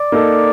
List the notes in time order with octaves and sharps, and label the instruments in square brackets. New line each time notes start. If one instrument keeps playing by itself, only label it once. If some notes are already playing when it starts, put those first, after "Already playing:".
Already playing: [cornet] D5
[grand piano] A#3 D#4 A4